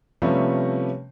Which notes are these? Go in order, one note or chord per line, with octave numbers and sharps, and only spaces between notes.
C3 F3 G3 A3 B3 C#4